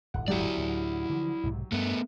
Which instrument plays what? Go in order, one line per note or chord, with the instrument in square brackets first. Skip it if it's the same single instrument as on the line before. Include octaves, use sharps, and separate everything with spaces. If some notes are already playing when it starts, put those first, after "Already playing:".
[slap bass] D1 G1 [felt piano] F#5
[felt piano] F#3 G4 F#5 [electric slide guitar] E4 D5
[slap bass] D2 A2
D3 E3 F3
B1 G#2 C3
[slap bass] G2 G3 [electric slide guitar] A3 B3